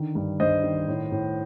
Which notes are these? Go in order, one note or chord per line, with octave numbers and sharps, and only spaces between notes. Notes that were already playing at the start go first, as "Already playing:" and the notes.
Already playing: D3 D#3
G2
G2 C5 D#5
D#3
A2
A2